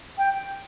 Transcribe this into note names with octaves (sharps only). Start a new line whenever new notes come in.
G5